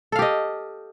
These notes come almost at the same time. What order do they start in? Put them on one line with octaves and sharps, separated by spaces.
A4 F5 G4 D#5